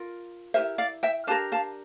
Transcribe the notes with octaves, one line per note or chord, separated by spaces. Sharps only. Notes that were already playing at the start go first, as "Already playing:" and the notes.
Already playing: F4 A#4
E4 G4 A#4 C5 E5
D5 F5
E5 G5
D4 G4 A#4 F5 A5
F5 A5